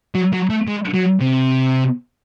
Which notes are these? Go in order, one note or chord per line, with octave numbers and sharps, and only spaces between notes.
F#3
F#3
A3
G#3
F#3
C3